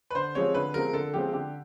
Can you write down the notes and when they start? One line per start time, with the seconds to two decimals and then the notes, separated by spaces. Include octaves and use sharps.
0.10 B4
0.15 D3 C5
0.35 F3 G#3 C4 C#5
0.54 D3 B4
0.74 F3 G#3 C4 A#4
0.93 D3 A4
1.14 F3 G#3 C4 G4
1.33 D3 G4